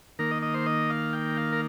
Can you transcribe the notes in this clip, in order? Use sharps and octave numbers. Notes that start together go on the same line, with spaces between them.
D#3 A#3 A#4
D#5
D#5
C5
D#5
F5
G5
F5
A#4